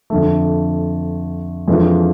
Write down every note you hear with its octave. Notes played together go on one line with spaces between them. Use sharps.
F2 D3 A3
F2 E3 G#3 D4 F4